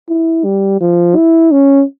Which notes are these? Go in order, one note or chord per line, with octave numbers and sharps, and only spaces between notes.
E4
G3
F3
E4
C#4